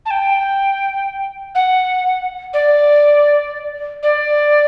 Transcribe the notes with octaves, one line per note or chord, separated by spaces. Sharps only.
A5
G5
F#5
D5
D5